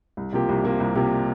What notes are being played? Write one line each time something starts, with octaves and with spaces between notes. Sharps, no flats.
C2
C3 F3 A#3 G4
C2
C3 F3 A#3 G4
C2
C3 F3 A#3 G4